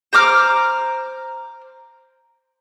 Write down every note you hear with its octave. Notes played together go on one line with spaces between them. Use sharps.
C5 A#5 D6 F6